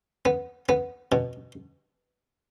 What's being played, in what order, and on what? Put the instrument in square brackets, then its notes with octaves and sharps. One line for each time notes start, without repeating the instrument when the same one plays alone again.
[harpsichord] B3
B3
B2